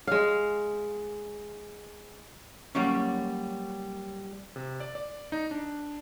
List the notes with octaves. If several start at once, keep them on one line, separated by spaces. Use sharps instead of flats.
G#3 F5
F#3 G3 A#3 C#4
C3
D5
D5
D#4
D4